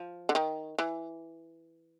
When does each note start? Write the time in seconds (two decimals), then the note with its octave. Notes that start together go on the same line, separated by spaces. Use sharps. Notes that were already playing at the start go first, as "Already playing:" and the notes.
Already playing: F3
0.29 D3
0.35 D#3
0.79 E3